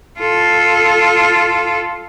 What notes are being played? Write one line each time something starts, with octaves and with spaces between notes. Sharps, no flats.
F4 A4